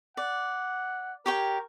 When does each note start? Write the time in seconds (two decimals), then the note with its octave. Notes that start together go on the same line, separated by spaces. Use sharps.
0.17 D5 F#5
1.26 G4 A#4 C#5 G5